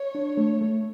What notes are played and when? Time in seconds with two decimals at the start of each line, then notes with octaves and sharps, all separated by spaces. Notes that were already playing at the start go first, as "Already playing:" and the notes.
Already playing: C#5
0.15 D4
0.37 A3
0.61 A3